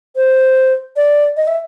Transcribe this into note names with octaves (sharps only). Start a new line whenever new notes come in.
C5
D5
D#5
E5